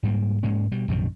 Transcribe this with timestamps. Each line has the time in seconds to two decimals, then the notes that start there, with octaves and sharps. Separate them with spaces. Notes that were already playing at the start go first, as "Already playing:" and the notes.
0.03 G#2 G3 A3 A#3
0.43 G#2 G#3 A#3 C#4
0.72 B2 G3
0.88 A#1 F#2 C3 D#3